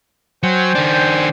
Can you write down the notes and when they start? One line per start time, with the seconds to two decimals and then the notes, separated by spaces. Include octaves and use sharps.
0.43 F#3 C5 G5 G#5
0.75 D#3 D4